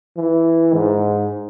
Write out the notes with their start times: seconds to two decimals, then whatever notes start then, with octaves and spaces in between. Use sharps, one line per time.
0.17 E3
0.74 G#2